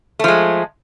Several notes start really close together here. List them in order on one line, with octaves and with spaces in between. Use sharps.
A3 F3 G#3